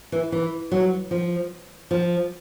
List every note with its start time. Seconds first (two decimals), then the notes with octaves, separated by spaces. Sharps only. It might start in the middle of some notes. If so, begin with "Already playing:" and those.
0.12 E3
0.32 E3
0.72 F#3
1.11 F3
1.91 F3